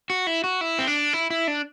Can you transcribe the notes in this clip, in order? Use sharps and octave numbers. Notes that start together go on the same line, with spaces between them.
F#4
E4
F#4
E4
C4
D4
E4
E4
D4